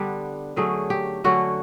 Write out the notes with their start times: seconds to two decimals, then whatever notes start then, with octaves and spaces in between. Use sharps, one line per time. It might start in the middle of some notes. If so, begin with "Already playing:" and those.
Already playing: D3 G3 B3 D4
0.56 D3 F#3 A3 C#4 G#4
0.90 G4
1.24 D3 F#3 A3 C#4 F#4